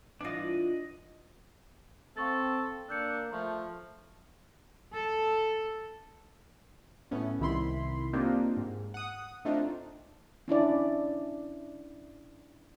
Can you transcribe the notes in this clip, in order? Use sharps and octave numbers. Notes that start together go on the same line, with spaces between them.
E3 D4 F4 D#5
C4 A4 F5 C#6 A6
A#3 D4 E6 G6 C#7
F3 A3 C#6
A4
A2 A3 B3 C#4
C2 D#3 E4 B5 C6
A#3 C4 D4 D#4 F4 G4
G#2
F#5 D#6
A3 C4 D4 D#4 F4
C#4 D4 E4 D5